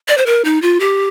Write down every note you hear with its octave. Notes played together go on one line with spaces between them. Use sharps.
D5
C5
A#4
D#4
F4
G4